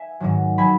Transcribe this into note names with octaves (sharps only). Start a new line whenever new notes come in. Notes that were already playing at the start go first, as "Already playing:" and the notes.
Already playing: E5 G#5
G#2 D#3 F#3
F#3 G#5 B5